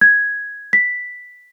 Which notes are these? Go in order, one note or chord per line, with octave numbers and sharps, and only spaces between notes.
G#6
B6